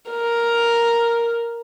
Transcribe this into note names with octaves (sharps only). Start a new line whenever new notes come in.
A#4